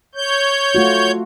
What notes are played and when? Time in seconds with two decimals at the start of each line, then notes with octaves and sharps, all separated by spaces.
0.15 C#5 G6
0.75 A3 F4 F#4